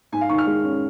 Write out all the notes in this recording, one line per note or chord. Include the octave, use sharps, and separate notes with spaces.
G#2 G#5
F5
D#3 C#6
F6
G#3
C#4